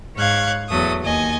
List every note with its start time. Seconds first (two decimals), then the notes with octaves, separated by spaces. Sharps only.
0.17 G#2 C#5 F5 F#6 G#6
0.70 E2 F#3 A3 D#6
1.03 D#2 D#5 G#5